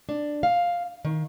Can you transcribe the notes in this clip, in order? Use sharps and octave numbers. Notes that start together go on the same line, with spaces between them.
D4
F5
D#3